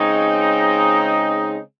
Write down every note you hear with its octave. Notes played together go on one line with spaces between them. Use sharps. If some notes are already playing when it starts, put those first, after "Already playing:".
Already playing: C#3 G#3 C4 D#4 C#5
D#5